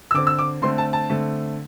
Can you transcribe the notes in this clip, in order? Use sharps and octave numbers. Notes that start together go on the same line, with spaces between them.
E6
D3 C4 D6
E6
D6
D3 A3 C4 C6
A5
A5
D3 A3 C4